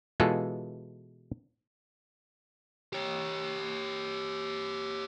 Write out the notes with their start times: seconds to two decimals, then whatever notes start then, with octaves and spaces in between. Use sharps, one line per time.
0.20 B2 E3 G#3 F4 G#4 A4
2.93 G4 C#5